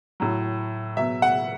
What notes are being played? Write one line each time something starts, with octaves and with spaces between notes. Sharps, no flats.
A2 F#3
B2 F#3 E5
F#5